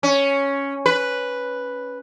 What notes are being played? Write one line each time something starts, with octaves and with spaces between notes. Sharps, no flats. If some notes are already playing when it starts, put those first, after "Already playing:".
C#4
B4